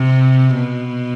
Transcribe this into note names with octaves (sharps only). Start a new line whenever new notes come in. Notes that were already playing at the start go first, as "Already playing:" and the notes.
Already playing: C3
B2